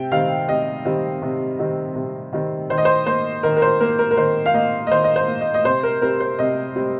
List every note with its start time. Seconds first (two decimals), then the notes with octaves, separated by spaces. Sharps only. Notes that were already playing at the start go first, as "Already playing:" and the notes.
Already playing: C3 G5
0.11 D#3 G3 C4 F5
0.48 C3 D#5
0.85 D#3 G3 C4
1.22 C3
1.59 D#3 G3 C4
1.95 C3
2.33 D#3 G3 C4
2.70 D#3 C5
2.78 D#5
2.85 C5
3.06 A#3 C5
3.43 D#3 A#4
3.57 A#4
3.62 C5
3.80 A#3 A#4
3.99 A#4
4.11 A#4
4.17 D#3 C5
4.46 F5
4.54 A#3 D#5
4.87 D#5
4.91 D#3 C5
5.04 D#5
5.16 C5
5.28 A#3
5.41 D#5
5.54 D#5
5.64 C3 C5
5.83 A#4
6.02 G3 C4 A#4
6.20 C5
6.39 C3 D#5
6.76 G3 C4